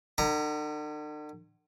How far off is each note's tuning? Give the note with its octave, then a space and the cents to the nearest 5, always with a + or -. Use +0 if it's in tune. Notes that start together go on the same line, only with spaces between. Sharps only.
D3 +45 A#5 +0